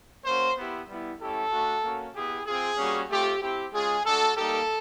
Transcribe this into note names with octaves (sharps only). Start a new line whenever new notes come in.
A#3 C#4 F#4 C5
B3 E4 G4
G3 B3 E4
A3 C#4 E4 G4 A4
A3 D4 F#4
A#3 C#4 F#4
B3 E4 G4 G#4
C4 F4 G#4
G3 A#3 C#4 F#4
A3 C4 F4 G4
C4 E4 G4
G#3 C#4 F4 G#4
A3 D4 F#4 A4
G3 A#3 D#4 G4 A4